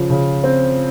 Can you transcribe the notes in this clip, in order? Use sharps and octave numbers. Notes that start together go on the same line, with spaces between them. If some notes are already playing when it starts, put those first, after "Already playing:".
Already playing: C#3 F3
C#3
C4